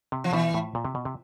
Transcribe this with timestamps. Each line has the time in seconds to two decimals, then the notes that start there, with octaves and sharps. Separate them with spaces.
0.12 C3
0.24 F3
0.33 B2 E3
0.54 A2
0.75 A#2
0.85 C3
0.95 B2
1.05 C3